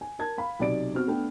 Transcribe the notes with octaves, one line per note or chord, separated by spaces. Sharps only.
G#5
A#4 A5 G#6
F5 B5
B1 C3 D5 D7
B3 C4 F#4 F6
A3 B3 D4 G5